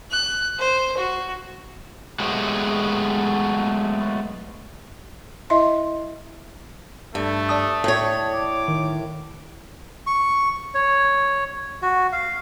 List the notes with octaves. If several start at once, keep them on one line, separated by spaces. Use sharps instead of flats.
F#6
C5
F#4
F#3 G#3 A3 B3 F#4 G4
E4 D#5 E5 C6
G2 A3
D5 A5 D#6
A2 C#5
D6
D#3
C#6
C#5
F#4
F5